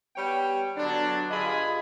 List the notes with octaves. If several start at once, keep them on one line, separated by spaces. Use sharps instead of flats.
G3 B3 C#5 G5
D3 F#3 B3 D4
G2 F4 G#4 D#5 G#5 B5